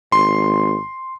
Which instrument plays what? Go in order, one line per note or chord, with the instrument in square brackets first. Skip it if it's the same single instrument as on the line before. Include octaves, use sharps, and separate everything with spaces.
[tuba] G#1 [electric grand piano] C6